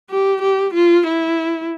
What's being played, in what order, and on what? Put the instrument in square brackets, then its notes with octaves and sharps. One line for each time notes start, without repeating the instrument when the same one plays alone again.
[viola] G4
G4
F4
E4